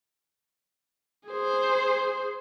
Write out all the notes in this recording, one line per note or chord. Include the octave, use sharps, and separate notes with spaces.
G#4 C5